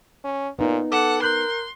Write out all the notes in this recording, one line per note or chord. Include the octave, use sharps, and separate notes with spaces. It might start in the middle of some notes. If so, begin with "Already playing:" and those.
C#4
A#2 B3 D#4
A4 F#5 D6 E7
A#4 C6 F#6 G6 F#7